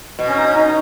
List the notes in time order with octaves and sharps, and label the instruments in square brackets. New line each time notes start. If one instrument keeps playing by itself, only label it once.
[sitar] B2
[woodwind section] C#4
D#4
C#4
D#4